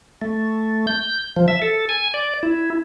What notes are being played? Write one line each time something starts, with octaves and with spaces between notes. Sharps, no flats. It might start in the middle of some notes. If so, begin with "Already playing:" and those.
A3
G6
F3
E5
A4
G#5
D5
E4